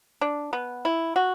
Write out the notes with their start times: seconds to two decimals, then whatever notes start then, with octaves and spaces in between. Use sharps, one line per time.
0.21 D4
0.53 B3
0.85 E4
1.16 F#4